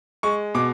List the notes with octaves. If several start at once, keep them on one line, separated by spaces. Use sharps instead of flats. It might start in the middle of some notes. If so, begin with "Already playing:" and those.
G#3 C#6
B2 D6